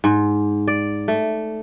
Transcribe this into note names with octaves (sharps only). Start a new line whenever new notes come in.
G#2
D5
A3